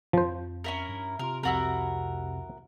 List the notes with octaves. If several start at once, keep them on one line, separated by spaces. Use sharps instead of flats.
F2 F3 C5
C#4 E4 A#4
G2
C3 F4 A#4 C6
C2 F2 C3 E4 F#4 A#4